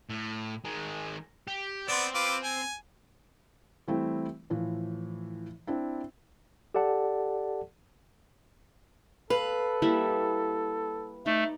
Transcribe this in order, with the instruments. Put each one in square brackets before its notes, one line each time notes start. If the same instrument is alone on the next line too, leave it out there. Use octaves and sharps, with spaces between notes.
[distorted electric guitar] A2
D#3 G#3
G4
[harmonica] B3 D5 [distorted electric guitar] C4 C6
[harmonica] F4 B4 D6
G#5
[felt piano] E3 G3 A3 C4 E4
A2 E3 F3
C4 D4 E4
[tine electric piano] G4 A4 D5 F#5 A5
[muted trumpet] A4 [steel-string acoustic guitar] B4 [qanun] F5
[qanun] G3 A#3 E4
[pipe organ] A3 [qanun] D#4 D5